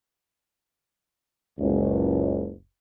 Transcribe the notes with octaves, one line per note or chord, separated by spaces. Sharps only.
F#1 C#2